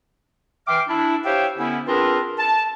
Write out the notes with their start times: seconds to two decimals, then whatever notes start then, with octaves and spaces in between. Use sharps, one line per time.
0.67 E3 E5 G5 C6 D6 F6
0.87 D4 E4
1.24 G4 C5 C#5 E5 F5 G5
1.58 D3 B3 C#4 E4
1.86 C4 D4 F4 G#4 A#4 B4
2.38 A5